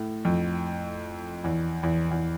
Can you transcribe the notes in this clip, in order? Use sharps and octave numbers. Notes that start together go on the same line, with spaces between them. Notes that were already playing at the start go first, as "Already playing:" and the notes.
Already playing: A2
F2
E2
E2
E2